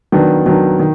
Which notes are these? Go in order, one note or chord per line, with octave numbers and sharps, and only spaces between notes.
D#3 F#3 B3 D4
D#3 F#3 B3 D4
D#3